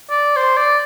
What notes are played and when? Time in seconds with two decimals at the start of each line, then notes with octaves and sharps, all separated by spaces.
0.10 D5
0.37 C5
0.57 D5